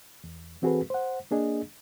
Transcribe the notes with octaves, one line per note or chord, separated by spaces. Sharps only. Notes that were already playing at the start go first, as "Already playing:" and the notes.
E2
E3 C4 F#4 G#4 A4 B4
C5 F#5
A#3 D4 G#4 D#5